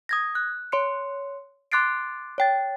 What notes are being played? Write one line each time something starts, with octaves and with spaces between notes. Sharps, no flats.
D#6 G#6 A#6
F#6
C#5 C6 C#7
C6 D6 F#6 A6 C7 D7
C#5 G5 A6